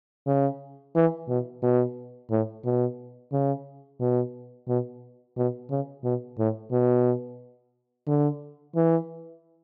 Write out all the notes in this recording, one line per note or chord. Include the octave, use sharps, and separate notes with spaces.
C#3
E3
B2
B2
A2
B2
C#3
B2
B2
B2
C#3
B2
A2
B2
D3
E3